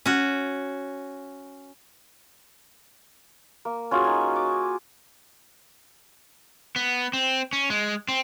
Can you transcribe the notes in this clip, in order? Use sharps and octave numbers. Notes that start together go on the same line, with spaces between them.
C#4 F#4
A#3
C#4 F4 F#4 G#4
D#4 G#5
D6
B3
C4
C#4
G#3
C4